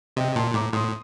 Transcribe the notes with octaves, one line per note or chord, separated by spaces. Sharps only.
C3 D#5 G5
A#2 A5 C6
A2 A#5 D6
A2 C6 D#6